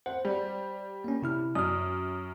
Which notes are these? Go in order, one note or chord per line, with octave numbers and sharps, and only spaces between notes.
C5 F#5
G3
A#3 C#4
C3 E4 F6
F#2 D#6 F6